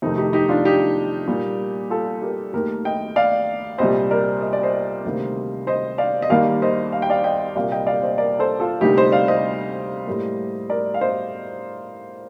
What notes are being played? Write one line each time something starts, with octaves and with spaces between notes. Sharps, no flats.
F2 C3 D#3 A3 D#4
D#4 G4
D#4 G4
D4 F4
D#4 G4
A#2 G3 A#3
F4 A4
G4 A#4
D#2 D#3 A3 G4 A#4
D#5 G5
D5 F5
C2 A#2 G3 C5 D#5
A#4 D5
D#5
D5
C5 D#5
D2 C3 D#3 G3 A#3
C5 D#5
D5 F5
D#5
D#2 D#3 G3 A#3 D5 F5
C5 D#5
F5
G5
D5 F5
D#5 G5
C2 A#2 G3 A#3 D5 F5
D#5 G5
D5 F5
C5 D#5
A#4 D5
A4 C5
F4 A4
D2 C3 G3 A#3 D#4 G4
C5 D#5
D5 F5
C5 D#5
A2 G3 A#3
A#4 D5
F5
C5 D#5